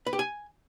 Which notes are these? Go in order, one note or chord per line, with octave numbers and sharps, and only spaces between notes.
B4
G4
G#5